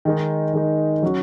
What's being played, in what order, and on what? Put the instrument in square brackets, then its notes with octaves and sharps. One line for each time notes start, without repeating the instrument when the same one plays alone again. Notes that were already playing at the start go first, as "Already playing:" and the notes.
[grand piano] D#3 G#3 D#4
D#3 G#3 D#4
F#3 C#4 F#4